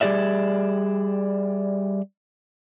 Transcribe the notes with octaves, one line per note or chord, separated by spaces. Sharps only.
G3 G4 G#4 D5 E5